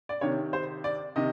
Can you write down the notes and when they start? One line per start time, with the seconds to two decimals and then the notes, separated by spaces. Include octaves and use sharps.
0.09 D5
0.21 C3 D#3 C#5
0.53 C5
0.84 D5
1.16 C3 D#3 D#5